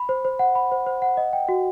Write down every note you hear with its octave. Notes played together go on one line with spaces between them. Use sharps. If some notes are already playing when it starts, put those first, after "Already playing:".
Already playing: B5
C5
C5
F#5
B5
C5
C5
F#5
D#5
G5
F#4